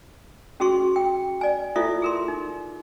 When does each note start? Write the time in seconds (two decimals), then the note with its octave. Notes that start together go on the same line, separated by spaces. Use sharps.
0.60 C#4 F#4 G#4 C6 C#6
0.96 G5
1.41 D5 G#5
1.76 E4 F4 A4 C5 D5 E5
2.02 G#4 A#4 C6
2.28 D#4